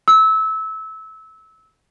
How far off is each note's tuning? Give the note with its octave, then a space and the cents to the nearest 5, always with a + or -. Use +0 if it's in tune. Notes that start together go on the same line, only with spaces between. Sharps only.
E6 -25